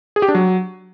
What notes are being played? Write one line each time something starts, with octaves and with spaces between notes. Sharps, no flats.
G#4
G4
D4
F#3